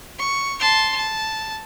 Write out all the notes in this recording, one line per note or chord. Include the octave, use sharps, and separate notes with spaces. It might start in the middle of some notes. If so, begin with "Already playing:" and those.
C#6
A5 C6
A5